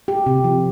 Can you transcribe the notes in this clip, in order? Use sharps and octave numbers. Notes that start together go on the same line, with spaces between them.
G4
C3
F3